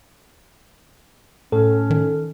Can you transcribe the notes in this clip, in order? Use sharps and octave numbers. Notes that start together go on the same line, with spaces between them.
A2 C#4 A4
D#3